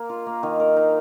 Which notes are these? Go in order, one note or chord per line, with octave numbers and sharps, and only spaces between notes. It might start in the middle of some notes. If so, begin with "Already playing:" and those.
Already playing: A#3
F4
A#3
D#3
A#4
D#4